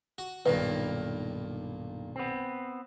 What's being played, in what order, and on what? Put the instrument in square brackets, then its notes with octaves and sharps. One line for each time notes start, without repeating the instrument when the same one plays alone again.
[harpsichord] F#4
[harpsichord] B1 A#2 D#3 [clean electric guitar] G2 A#3 [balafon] B4
[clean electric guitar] B3 C4